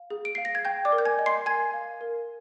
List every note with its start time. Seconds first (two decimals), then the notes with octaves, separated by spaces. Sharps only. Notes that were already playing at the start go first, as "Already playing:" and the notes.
Already playing: F5
0.10 G#4
0.25 D7
0.35 F5 C7
0.45 A#6
0.55 G#6
0.65 G5 G6
0.85 D5 D6
0.92 A#4
0.98 G6
1.05 G#5 G#6
1.19 D#5
1.26 C6 C7
1.46 A#4 G#5 G#6
1.74 F5
2.01 A#4